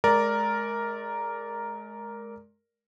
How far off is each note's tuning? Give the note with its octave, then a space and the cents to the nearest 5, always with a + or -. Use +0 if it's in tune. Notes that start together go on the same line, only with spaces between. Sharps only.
G#3 +30 A#4 +0 D5 -10